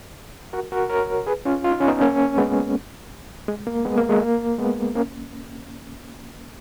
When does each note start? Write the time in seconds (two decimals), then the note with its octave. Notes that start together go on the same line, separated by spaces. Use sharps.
0.53 F#4 A#4
0.72 F#4 A#4
0.90 A#4 C#5
1.27 G#4 B4
1.45 C#4 F4
1.64 F4
1.71 D#4
1.80 C#4
1.88 B3 D#4
2.01 A#3 C#4
2.38 G#3 B3
3.48 G#3
3.67 A#3
3.85 G#3 B3
3.97 A#3
4.09 G#3
4.21 A#3
4.58 G#3 B3
4.96 A#3 C#4